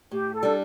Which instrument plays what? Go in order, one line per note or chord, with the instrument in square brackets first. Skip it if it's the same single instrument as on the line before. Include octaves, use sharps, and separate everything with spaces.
[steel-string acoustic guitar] A2 [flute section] G4
[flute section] A4
[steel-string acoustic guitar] G3 D4